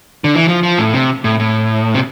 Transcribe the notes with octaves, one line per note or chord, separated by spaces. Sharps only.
D3
E3
F3
F3
A2
C3
A2
A2
C3